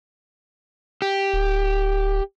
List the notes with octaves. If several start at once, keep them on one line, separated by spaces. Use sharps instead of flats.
G4
D1